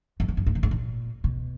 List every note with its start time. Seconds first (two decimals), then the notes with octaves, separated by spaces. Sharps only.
0.20 F#2
0.28 F2
0.37 F#2
0.46 G#2
0.55 A#2
0.63 G#2
0.71 A#2
1.24 B2